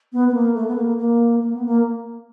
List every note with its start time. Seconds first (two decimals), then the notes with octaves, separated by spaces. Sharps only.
0.13 B3
0.28 B3
0.34 A#3
0.54 A3
0.67 B3
0.76 A#3
0.97 A#3
1.40 A#3
1.53 B3
1.66 A#3